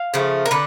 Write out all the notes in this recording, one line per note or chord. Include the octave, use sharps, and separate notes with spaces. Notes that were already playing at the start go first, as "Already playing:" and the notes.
Already playing: F5
C#3 F3 A3
A#4
D3 B4